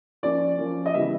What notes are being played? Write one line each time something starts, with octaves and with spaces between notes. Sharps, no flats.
F3 A#3 C#4 D5
F3 A#3 C#4
D#5
C#3 E3 G3 B3 E5